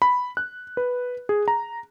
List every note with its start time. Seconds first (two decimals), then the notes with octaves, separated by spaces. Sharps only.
0.02 B5
0.37 F#6
0.77 B4
1.29 G#4
1.48 A#5